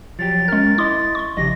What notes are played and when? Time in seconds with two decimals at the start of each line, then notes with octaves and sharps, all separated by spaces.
0.19 F3 F#3 G4 A6
0.48 G#3 C#4 A#4 F6
0.78 E4 D#5 C6 D6 D#6
1.15 C6 C#6
1.37 A#1 C#3 G4 D#5 A#6